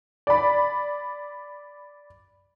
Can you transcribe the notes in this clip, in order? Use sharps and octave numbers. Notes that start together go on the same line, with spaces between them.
D5 B5